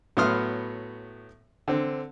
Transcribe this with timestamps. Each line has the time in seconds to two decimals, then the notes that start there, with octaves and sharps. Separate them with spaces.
0.17 A2 F#3 B3 C6 D#6 F6
1.68 D3 C4